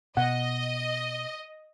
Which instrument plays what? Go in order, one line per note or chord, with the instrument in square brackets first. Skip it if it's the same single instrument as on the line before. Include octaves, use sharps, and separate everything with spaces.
[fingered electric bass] B2 [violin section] D#5 [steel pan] F#5